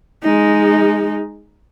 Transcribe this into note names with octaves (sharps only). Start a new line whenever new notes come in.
G#3 D#4